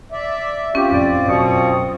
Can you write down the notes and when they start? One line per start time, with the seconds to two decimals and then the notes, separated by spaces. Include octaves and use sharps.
0.12 D5 E5
0.75 C4 C#4 F4 G4
0.91 F2 A2 D5
1.28 F#2 B2 C#6 D#6